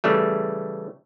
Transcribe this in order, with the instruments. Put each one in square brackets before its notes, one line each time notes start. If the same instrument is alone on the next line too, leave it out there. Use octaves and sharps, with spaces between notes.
[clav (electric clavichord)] C#3 E3 G3 A3